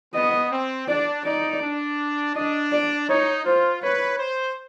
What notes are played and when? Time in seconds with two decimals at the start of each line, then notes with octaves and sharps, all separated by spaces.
0.14 B3 D#5
0.51 C4
0.88 D4 D5
1.25 D#4 D5
1.61 D4
2.35 D4 D#5
2.72 D5
3.09 D#4 C#5
3.45 F4 C5
3.83 B4 C#5
4.19 C5